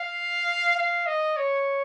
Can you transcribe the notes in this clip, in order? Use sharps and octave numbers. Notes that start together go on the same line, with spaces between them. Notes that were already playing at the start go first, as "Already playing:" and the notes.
Already playing: F5
F5
D#5
C#5